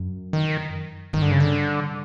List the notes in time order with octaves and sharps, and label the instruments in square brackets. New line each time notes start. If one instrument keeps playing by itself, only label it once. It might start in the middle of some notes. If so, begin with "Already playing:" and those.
Already playing: [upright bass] F#2
[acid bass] D#3
[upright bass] G2 [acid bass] D#3
[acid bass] D3
C#3
D3